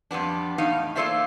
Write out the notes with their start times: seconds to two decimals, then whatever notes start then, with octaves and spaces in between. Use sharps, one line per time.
0.11 F2 G3 B3 D4
0.58 E2 A2 D#4 F5
0.96 A#3 F4 A4 C5 D5 E5